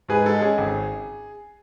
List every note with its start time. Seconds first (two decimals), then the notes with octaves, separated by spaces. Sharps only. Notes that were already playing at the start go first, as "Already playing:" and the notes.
0.09 G#2 G#4 B4
0.25 G#3 A4
0.41 C#4 G#4
0.58 G#1